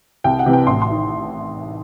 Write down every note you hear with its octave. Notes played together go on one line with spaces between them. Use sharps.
C2 G5
F#5
C3 E3
G5
A1 C6
C6
D#3